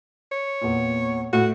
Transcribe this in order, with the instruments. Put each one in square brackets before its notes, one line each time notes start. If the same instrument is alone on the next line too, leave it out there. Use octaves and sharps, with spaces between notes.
[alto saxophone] C#5
[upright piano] E2 A#2
[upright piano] A2 [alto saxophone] F#4